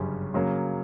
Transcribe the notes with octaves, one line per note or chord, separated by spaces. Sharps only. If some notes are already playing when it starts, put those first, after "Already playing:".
Already playing: G1 F#2 C#3 G3 C#4
C#3 F#3 A#3